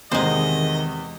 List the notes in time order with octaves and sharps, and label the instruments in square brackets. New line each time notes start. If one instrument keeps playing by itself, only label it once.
[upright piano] E2 C3 A#5 [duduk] D#3 [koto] G#3 C5 [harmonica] D#5